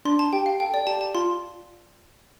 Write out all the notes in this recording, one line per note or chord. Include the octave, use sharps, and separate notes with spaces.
D4 C6
A5
G4 G5
F5
A4 G5
D5
G4 A5
A5
F4 C6